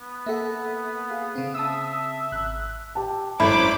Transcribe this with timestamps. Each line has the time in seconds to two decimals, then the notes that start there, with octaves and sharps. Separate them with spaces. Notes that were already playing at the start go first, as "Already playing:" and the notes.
0.01 B3
0.26 A#3 A4 E5 F#5
1.10 G#4 F5
1.36 C#3 C4
1.55 E5 A5 D#6 E6
2.32 G#1 F#6
2.95 G4 A5
3.40 G#1 F#2 A3 E4 C5 C#5 B5 D6